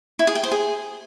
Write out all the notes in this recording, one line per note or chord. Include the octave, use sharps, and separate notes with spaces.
E4
G#4
G5
C5
G#4